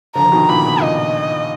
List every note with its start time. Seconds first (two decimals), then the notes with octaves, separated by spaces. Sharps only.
0.16 D3 F3 A#5
0.26 F3
0.32 B2 D#3
0.49 A#2 D3 B5
0.65 B2
0.81 A#2 D#5